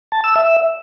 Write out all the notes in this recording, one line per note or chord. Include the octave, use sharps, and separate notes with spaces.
A5
E6
E5